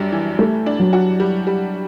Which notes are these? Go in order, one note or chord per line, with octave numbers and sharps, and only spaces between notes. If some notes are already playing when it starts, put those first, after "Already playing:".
Already playing: F#2 G3 D4
E3
G3 A3
D4
F#3
F#4
G3
G3